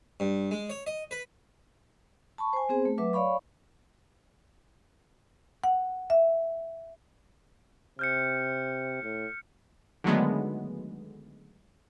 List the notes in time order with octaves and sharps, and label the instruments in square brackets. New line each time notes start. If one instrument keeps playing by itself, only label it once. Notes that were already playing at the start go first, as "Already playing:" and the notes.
[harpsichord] G2
G#3
C#5
D#5
B4
[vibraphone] A5 B5 C#6
C5 G#5
B3 C4 G#4 C5
A3
F#3 B4 E5 D6
C#5 D5 F5 B5 C#6
[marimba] F#5
E5
[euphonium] C3 [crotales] F6 G6 C#7
[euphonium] A2
[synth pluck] D3 D#3 F#3 G#3 A3 B3